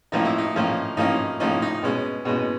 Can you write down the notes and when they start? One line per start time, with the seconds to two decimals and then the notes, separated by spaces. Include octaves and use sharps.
0.12 A2 F3 A#3 C#4 D#4
0.25 E4
0.38 D#4
0.55 A2 F3 A#3 C#4
0.97 A2 F3 A#3 C#4 D#4
1.40 A2 F3 A#3 C#4 D#4
1.62 D#4
1.83 B2 G#3 C#4
2.25 B2 G#3 C#4